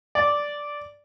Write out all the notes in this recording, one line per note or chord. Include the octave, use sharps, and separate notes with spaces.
D5